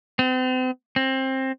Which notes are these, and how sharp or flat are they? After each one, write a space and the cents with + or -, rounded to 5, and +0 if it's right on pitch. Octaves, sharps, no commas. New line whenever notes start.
C4 -40
C4 +20